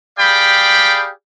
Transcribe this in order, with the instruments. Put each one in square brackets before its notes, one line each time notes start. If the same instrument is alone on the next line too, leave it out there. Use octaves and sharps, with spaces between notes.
[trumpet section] G4 G#4 D5 F5 G5 B5